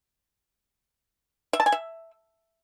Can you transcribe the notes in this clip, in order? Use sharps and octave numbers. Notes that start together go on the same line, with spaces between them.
E5
A5
G#5
E5